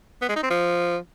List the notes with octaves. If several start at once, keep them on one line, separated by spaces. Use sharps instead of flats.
B3
G#3
D#4
C4
F3